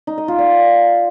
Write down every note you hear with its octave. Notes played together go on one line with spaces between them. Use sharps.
D#4
D#5
F4
D5